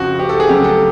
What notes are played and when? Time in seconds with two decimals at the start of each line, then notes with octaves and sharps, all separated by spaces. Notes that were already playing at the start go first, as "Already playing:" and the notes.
Already playing: F2 C#3 F3 F#4
0.19 G4
0.29 A4
0.40 G#4
0.49 C#3 F#3 A3 G4
0.64 A4